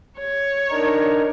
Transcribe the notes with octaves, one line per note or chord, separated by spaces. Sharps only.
C#5
D4 D#4 A#4